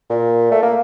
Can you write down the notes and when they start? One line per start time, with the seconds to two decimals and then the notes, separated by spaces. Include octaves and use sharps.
0.10 A#2
0.52 A3
0.63 A#3